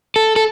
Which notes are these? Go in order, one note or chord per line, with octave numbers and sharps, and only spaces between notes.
A4
A4